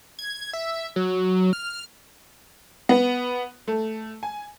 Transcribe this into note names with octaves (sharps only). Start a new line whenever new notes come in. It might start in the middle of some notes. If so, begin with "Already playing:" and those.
G#6
E5
F#3
F6
B3
A3
G#5